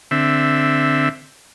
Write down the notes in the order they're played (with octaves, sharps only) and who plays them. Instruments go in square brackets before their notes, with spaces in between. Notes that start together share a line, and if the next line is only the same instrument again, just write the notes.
[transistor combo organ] D3 C4 E5